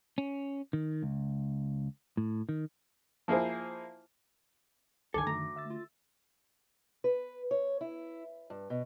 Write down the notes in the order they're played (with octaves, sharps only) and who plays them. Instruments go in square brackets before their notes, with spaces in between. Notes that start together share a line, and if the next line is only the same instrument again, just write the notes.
[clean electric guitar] C#4
D#3
C#2
A2
D#3
[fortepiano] F3 A#3 E4 G#4 C5
[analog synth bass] C2 [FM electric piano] F#2 D3 D#3 [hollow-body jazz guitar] A4 G#5 [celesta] D6
[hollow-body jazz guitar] D2 A#5 [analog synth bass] A3
[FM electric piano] E5 E6 A6
[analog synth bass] F4
[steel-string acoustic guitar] B4
C#5
E4
G2
B2